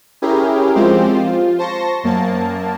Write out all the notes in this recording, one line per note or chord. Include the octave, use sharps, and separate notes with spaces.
C#4 E4 G4 G#4 A#4
F3 G#3 C4 G4 C5
F4
C5 A5 C#6 A#6
F#2 A#3 A5